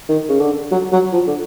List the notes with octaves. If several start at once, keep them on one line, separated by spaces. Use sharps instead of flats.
D#3
C#3
D3
F#3
F#3
F3
D3